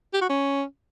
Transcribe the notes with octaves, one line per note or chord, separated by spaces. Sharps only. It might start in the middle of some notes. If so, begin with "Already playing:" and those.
G4
F#4
C#4